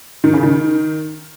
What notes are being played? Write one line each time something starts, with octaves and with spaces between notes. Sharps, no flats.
D#3
C#3
D#3